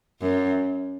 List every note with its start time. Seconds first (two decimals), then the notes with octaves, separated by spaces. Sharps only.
0.21 F#2